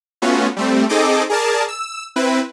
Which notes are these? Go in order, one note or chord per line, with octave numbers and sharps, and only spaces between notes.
A3 B3 C#4 F4 F#4
G3 A3 C4
C4 D#4 G#4 A4 D#5 D6
G#4 A#4 D5 A5
E6
C4 E4 B4